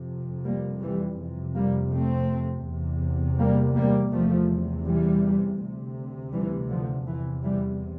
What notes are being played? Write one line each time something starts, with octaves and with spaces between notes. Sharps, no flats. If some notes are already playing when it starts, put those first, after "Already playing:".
Already playing: F2 C3
G3 A#3
E3 G3
F2 C3
G3 A#3
A3 C4
E2 C3
G3 A#3
G3 A#3
E2 C3 F3 A3
E3 G3
D2 C3
E3 G3
D3 F3
E2 C3 E3
E3 G3